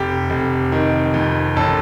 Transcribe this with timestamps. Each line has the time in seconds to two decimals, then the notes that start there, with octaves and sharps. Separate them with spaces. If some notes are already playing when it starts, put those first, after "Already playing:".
Already playing: F1 G4
0.30 F1
0.72 D#3
1.14 F2
1.56 A1 A4